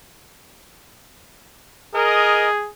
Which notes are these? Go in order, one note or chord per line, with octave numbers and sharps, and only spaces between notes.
G#4 A#4 D#5